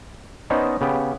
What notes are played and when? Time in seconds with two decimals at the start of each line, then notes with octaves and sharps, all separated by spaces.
0.50 B3 C#4 D#4 C5 D5 D#5
0.81 C#3 B3 G4